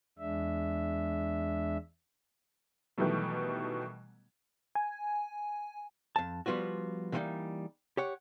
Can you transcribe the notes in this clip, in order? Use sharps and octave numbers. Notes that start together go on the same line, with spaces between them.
E2 G#3 D4 E5
B2 D#3 E3 F#3 G3 A3
G#5
F2 A5
F3 G3 B3 F4 F#4
D3 E3 F#3 G3 A#3 D#4
G4 C#5 F#5